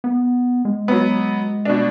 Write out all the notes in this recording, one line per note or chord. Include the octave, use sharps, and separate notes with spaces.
B3
G#3
F#3 B3
B2 D4